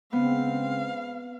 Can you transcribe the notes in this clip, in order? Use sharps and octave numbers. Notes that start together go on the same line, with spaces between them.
C#3 G#3 B3 C4 F5